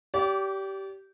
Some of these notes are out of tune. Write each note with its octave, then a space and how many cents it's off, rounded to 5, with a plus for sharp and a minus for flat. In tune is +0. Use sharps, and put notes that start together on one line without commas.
G4 -15 D5 -35